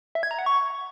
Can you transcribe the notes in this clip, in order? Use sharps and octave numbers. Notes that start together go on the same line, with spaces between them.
E5
G#6
A#5
F#5
C#6